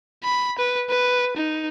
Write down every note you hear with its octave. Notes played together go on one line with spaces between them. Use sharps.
B5
B4
B4
D#4